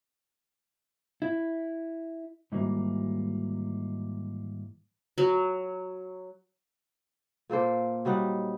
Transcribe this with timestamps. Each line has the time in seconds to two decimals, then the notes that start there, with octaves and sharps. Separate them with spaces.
1.22 E4
2.52 G#2 D#3 E3 F#3 G3 A#3
5.18 F#3
7.50 A#2 A#3 A4 C5
8.05 F#3 G3 D#4 F#5